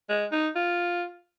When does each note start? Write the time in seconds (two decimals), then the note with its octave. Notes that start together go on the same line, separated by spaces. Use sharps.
0.09 G#3
0.32 D#4
0.56 F4